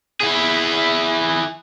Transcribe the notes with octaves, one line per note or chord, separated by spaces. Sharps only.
E4 G#4